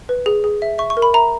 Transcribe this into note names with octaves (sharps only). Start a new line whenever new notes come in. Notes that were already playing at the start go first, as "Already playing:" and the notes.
B4
G#4
G#4
E5
E5 C#6
C#6
A#4
B5
E5 A#5